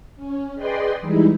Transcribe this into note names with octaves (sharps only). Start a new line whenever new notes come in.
C#4
G#4 B4 D5 D#5 G5 C6
E3 G3 G#3 D#4 E4